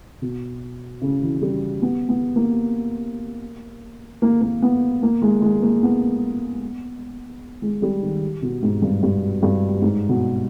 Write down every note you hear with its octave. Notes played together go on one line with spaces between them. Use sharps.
B2
C#3
E3
G3
B3
B3
A#3
A#3
A#3
B3
A#3
G#3
G#3
A#3
B3
G#3
G3
D#3
B2
G#2
G2
G2
G2
G#2
B2